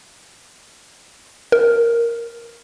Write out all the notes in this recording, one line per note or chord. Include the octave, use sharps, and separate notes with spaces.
A#4